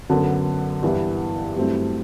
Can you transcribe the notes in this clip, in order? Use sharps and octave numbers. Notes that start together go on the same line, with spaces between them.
F#2 D3 F#3 B3
G2 E3 B3 E4
G2 F#3 A3 C4 E4